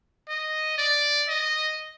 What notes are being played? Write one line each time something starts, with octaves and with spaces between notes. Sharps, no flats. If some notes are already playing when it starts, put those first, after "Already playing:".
D#5
D5
D#5